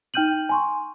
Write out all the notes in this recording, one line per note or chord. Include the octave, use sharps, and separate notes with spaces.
D#4 G5 F6 G6 D#7 F#7
G#5 C6 C#6